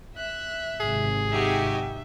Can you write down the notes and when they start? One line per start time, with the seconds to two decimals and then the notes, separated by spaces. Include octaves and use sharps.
0.17 E5 F#6
0.80 G#1 G#2 C3 G#4
1.30 D#4 F#4 G4 E5 G#5